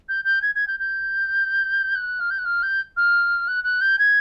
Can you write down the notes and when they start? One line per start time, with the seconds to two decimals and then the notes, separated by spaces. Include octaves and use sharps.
0.09 G6
0.25 G6
0.42 G#6
0.55 G#6
0.67 G6
0.80 G6
1.95 F#6
2.20 F6
2.30 G6
2.39 F#6
2.45 F6
2.63 G6
2.97 F6
3.48 F#6
3.64 F#6
3.81 G6
3.99 G#6